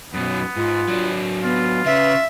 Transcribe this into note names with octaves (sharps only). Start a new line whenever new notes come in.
F#2 B2 B3
G#2 F4
F#3 D4
B3 F4
C#3 B4 E5